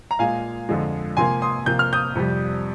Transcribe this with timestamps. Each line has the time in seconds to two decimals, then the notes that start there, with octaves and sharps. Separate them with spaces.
0.11 A#5
0.19 A#2 G#3 F5 G#5
0.69 F2 D3 F3 G#3
1.17 C3 F3 A#3 G#5 C6
1.42 C6 D#6
1.66 C3 F3 A#3 G6
1.79 F6
1.93 D#6 G6
2.15 F2 C3 G3